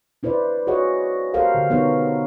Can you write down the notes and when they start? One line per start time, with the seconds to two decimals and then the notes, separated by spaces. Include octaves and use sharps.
0.23 D4 E4 B4 C5 D5
0.67 F#4 G#4 C#5 D#5 F#5
1.34 G4 A4 A#4 C5 F5 F#5
1.54 D3
1.70 B3 D#4 A#4 C#5